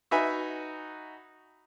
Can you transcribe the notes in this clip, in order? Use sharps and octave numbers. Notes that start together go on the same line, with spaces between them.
D#4 F#4 B4 E5 G#5 B5